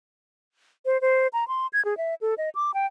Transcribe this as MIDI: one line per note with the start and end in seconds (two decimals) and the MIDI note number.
0.86 1.00 72
1.01 1.27 72
1.33 1.47 82
1.48 1.67 84
1.73 1.83 92
1.85 1.97 68
1.97 2.15 76
2.21 2.34 69
2.38 2.49 75
2.55 2.71 86
2.74 2.86 79